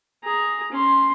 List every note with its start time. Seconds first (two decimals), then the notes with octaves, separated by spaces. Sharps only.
0.24 G#4 A#5
0.72 C#4 C6